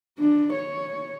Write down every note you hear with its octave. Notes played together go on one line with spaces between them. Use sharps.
D4
C#5